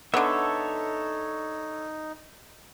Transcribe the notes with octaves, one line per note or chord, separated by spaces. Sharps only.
D3 B3 D#4 A4 C#5 E5